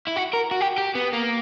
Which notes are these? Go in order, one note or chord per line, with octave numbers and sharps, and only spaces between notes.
E4
F#4
A#4
F#4
G4
G4
B3
A#3